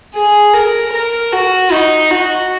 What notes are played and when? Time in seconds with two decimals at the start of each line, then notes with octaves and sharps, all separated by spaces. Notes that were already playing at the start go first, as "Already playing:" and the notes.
0.15 G#4
0.54 A#4
0.93 A#4
1.32 F#4
1.72 D#4
2.11 F#4